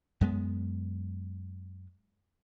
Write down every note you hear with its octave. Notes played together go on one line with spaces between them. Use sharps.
F#2 G#3 B3